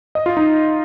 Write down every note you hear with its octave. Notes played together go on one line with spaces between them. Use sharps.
D#5
F4
D#4